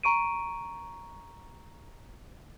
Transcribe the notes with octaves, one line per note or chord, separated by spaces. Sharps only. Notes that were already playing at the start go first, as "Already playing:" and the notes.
A#5 C#6 D7 D#7